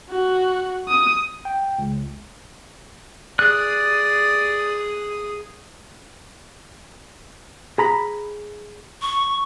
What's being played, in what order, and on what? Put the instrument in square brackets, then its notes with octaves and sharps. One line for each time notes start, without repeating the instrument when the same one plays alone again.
[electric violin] F#4
D#6
[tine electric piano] G5
C#2
[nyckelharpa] G#4 D#6 [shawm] D5 [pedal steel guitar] F#6
[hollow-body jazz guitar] G#4 A#5 B5
[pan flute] C#6